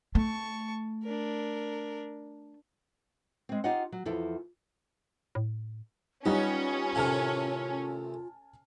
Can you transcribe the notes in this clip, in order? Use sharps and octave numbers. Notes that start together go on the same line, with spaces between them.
A3 A5 C#6
D4 A#4
G#3 C4
D#4 F4 G4 D#5 F#5
F#3
E2 F3 E4 A4
A2
G3 B3 C#4 D#4 F4
A2 C3 D#3 G#5 A5 F6